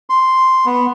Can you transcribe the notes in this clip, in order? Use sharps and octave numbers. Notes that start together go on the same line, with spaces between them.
C6
B3